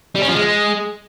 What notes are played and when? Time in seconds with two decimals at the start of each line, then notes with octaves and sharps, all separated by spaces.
0.15 G3
0.22 C#4
0.28 F3
0.35 G#3